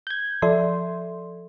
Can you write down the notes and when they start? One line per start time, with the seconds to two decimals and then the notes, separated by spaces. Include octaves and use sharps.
0.07 G6 G#6
0.42 F3 A4 D5 E5 C6